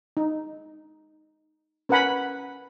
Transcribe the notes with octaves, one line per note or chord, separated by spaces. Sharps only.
D#4
C#4 A#4 B4 F#5 G#5 B5